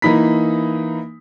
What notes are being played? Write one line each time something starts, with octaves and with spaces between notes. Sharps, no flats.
E3 A#3 D#4 B5 B6